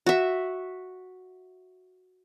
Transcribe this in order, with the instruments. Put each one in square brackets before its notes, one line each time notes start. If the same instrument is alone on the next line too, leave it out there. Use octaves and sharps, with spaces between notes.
[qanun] F#4 E5